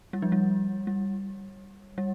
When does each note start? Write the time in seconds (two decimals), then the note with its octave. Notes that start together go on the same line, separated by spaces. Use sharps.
0.13 G3
0.22 F3
0.32 G3
0.87 G3
1.98 G3